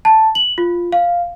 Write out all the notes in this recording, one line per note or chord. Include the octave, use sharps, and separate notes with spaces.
A5
F#7
F4
F5